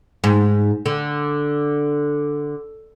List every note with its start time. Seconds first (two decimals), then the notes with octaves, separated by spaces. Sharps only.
0.24 G#2
0.86 D3